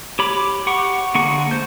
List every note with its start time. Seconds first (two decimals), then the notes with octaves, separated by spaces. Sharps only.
0.19 G4 C#5 B5 D6
0.67 G4 F#5 C#6
1.15 D3 A#3 G#4 F#5 C#6
1.51 A3 C5 G6